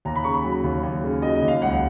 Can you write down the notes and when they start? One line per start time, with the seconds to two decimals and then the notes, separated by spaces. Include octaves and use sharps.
0.05 D#2 A#5
0.16 B5
0.24 C#3 C#6
0.34 B5
0.44 F#3
0.64 D#2
0.83 D#2
1.03 C#3
1.22 F#3 D#5
1.36 D#5
1.42 D#2
1.48 F5
1.62 C#2 F#5